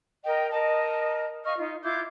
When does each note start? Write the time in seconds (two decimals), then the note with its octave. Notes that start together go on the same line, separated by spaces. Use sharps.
0.25 A#4 D#5 G5
0.51 A#4 D#5 A5
1.44 D#5 F5 C#6 F6
1.57 D#4 F4
1.83 E4 F4 D6 G6